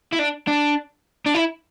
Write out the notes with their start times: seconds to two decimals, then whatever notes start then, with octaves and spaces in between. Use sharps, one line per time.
0.12 E4
0.19 D4
0.48 D4
1.26 D4
1.34 E4